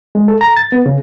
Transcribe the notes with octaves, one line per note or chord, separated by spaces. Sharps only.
G#3
A4
A#5
A6
B3
C#3